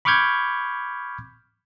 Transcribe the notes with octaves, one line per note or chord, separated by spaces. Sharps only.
B5 C#6 D6 F6 G6 G#6